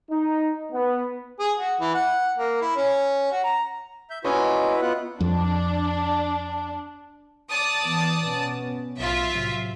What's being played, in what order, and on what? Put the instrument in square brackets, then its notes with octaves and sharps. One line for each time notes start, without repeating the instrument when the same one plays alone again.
[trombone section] D#4
B3
[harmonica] G#4
F#4
E3
F#5
A#3
E4
C#4
F#4
A#5
[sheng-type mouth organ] E5 G6
[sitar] A#2 C#4 D#5 [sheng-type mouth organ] E4 F#4 B4
[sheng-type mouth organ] B3 F4 F#5
[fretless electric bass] F2 [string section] D4
[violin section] D5 A5 D#6
[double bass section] E3 B3
B2 B3 C#4
[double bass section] B1 A2 [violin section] F4 E5
[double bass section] A2 C3 F#3